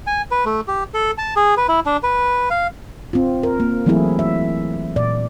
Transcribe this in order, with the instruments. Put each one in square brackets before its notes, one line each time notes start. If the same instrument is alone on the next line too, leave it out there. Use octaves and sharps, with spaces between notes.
[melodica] G#5
B4
A3
G4
A4
A5
G#4
B4
E4
D4
B4
F5
[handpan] C4 F4
A#4
A#3
E3 F#3 A3 C4 E4 G#4
E5
A#2 D5